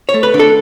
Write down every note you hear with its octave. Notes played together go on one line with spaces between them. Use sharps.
C#5
A3
B4
D3
A4